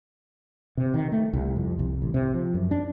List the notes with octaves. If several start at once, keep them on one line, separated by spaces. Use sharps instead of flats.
C3
D#3
A3
C2
F2
C2
A1
C3
F3
F#2
D4